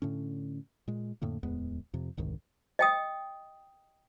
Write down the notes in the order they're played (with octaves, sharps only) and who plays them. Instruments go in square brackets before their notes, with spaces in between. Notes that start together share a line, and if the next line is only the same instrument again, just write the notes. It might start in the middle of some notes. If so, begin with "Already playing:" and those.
[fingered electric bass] A2 D3 C#4
A#2 G#3
F2 A2 D3 A#3
D1 E2 G#3 B3
F2 C3
E1 C2 G#2 D#3
[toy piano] D#5 G5 D#6